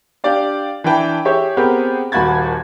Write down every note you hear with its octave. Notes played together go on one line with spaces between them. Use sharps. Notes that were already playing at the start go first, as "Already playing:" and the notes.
D4 G4 D5 F5
E3 D4 E4 B4 G5 A5
G4 G#4 C#5 E5
B3 C4 G4 G#4 A#4
D#1 D#2 F#4 B5 G#6 A6